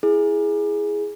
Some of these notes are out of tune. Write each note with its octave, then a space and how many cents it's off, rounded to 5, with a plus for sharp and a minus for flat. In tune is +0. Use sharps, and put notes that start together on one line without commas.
E4 +0 G#4 +0